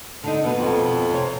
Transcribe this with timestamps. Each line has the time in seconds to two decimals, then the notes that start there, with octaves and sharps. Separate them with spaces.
0.24 D3 D4 D#4
0.44 B2 B3
0.59 F2
1.11 C3 C#5